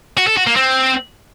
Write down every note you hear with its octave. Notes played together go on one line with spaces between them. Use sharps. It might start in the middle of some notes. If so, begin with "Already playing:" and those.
F#4
A4
F#4
A#3
C4